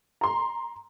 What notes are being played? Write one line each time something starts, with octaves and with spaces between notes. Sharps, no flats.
A#5 C6